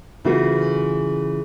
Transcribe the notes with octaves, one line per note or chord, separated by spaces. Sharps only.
C#3 E3 A3 A#3 F4 F#4